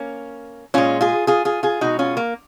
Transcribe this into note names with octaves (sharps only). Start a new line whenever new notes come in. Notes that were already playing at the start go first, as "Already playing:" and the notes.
Already playing: A#3 C#4
A#2 G#3 C#4 F4
F4 G#4
F4 G#4
F4 G#4
F4 G#4
B2 G#3 D#4 F#4
C#4 F4
A#3